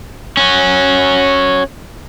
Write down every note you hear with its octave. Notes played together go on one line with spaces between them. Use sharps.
C#4 F#4